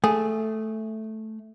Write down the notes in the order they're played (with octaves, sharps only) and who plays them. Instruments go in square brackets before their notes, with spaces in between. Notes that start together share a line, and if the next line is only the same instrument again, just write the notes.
[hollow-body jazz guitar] A3 [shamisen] G#4